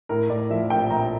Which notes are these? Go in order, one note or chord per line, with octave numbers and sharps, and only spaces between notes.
A2 A#4
A2 D5
F3 E5
A#1 G5
A#1 A#5